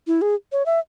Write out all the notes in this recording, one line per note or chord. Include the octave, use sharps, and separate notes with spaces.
E4
G#4
C#5
E5